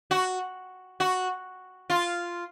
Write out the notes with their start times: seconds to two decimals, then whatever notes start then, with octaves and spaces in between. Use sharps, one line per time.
0.11 F#4
1.00 F#4
1.90 F4